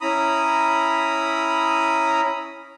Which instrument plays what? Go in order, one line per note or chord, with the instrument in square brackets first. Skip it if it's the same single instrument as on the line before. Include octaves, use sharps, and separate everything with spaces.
[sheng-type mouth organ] C#4 E4 A#5 B5 D#6